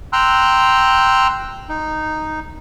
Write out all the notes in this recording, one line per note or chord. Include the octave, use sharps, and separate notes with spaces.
G5 A#5 C6 E6 F#6
D#4